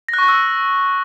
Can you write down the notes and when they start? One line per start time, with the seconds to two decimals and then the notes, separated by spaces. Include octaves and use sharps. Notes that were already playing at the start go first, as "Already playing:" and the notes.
0.08 A#6
0.14 F#6
0.19 C#6
0.24 F#6
0.29 E6